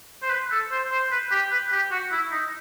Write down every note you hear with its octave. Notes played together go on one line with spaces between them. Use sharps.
C5
B4
A4
C5
C5
B4
G4
B4
G4
F#4
E4
D#4